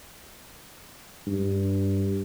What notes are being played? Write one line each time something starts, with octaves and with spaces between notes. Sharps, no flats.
G2